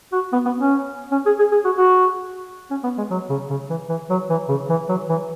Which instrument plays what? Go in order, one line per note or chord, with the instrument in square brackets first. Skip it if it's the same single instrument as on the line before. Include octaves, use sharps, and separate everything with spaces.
[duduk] F#4
B3
B3
C#4
C#4
G#4
G#4
G#4
F#4
F#4
C#4
B3
G#3
F#3
C#3
C#3
E3
E3
F#3
E3
C#3
E3
F#3
E3